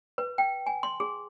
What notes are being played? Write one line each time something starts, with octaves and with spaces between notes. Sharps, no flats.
B4
G5
G#5
C6
G#4